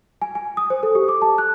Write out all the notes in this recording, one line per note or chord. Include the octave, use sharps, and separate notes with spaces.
G#5
G#5
D#6
C5
A4
G4
D6
A5
F#6